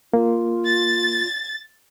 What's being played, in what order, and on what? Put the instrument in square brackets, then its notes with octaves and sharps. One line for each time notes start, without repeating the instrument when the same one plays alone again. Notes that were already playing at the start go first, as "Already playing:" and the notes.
[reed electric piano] A#3 [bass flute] F4
[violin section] A6